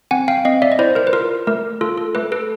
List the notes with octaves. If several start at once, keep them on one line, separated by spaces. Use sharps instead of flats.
C4 F#5 G#5
F5 G5
C4 D#5 F5
D5 E5
D#5
E4 C5 D5
A#4 C5
B4
F4 A#4
A3 A#4
F4 A4
A4
A3 A4 B4
A4 B4